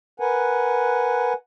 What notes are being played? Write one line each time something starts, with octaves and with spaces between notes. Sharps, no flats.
A#4 B4 F#5 G#5